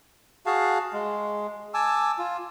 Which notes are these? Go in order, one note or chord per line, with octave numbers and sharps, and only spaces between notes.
F#4 G#4 F5 A5
G#3
G#5 A5 D6 E6
F4